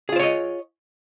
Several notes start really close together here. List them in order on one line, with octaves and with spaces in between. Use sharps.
G#4 F4 C5 C#5 D#5